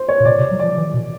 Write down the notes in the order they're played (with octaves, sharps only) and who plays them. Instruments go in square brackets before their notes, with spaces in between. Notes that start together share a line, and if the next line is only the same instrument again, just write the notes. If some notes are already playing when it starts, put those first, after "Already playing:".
Already playing: [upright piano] C5
C#5
[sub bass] A#2
[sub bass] B2 [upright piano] D5
[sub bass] C3
F#3
[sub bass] F3 [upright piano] D5
[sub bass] E3
B2